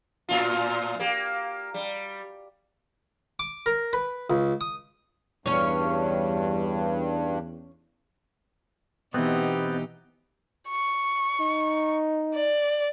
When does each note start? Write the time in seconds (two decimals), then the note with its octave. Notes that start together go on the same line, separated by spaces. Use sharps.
0.29 A2 F4
1.00 A#3 G4
1.74 G3
3.39 D6
3.66 A#4
3.93 B4
4.30 C#2
4.61 D#6
5.46 E2 G2 C#4 C#5
9.14 B2 E3 B3 C4 D#4 G4
10.69 C#6
11.40 D#4
12.35 D5